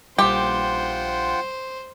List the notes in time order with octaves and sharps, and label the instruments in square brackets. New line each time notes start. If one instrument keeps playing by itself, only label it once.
[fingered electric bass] A#1 G3 [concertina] F4 F#5 G5 [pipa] G4 [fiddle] C5